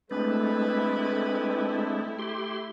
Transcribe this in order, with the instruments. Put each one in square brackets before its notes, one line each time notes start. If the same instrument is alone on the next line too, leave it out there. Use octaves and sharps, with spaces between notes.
[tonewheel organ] G#3 C4 D4 [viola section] A3 E4 [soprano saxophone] B4
[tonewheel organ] G4 C6